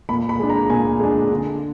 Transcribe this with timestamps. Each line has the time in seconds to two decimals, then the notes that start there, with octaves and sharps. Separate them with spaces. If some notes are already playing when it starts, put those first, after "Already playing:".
0.09 A#2 B5
0.29 B5
0.39 G#3 D4
0.50 A#5
0.70 A#2 G#5
1.00 G#3 D4
1.30 D3